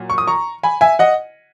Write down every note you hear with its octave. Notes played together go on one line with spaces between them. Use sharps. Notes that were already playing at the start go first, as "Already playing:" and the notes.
Already playing: A#2 F#3
C#6
D#6
A#5 C#6
G#5 B5
E5 G#5
D#5 F#5